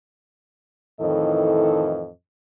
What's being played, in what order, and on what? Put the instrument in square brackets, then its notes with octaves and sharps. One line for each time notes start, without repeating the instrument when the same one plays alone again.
[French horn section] F2 A2 D#3 E3 A4 D#5